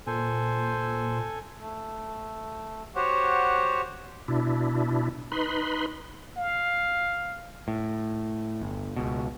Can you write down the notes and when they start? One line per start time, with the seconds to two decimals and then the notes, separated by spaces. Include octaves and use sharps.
0.07 A#2 A4 C5 G#5
1.60 A3
2.95 F#4 G4 C5 C#5 F#5
4.28 B2 D4 E4
5.32 D#4 B4 B5 C6
6.37 F5
7.68 A2
8.61 G1
8.96 C#2 B2